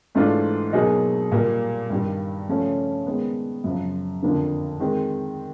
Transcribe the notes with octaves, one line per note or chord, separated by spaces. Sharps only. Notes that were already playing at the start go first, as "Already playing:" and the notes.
G#2 E3 A3 D4 F4
B2 F#3 A#3 D#4 G#4
A#2 G3 A#3
G2 D#3 G3
C#3 F3 A3 C#4
D#3 G#3 B3
F#2 C#3 F3
F2 D3 F3 A#3 D4
D#3 G#3 C4